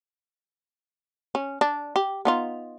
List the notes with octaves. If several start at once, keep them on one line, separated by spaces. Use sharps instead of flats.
C#4
D4
G4
B3 D#4 F4